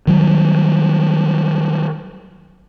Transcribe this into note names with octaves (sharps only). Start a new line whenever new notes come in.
D#3 F#3 G3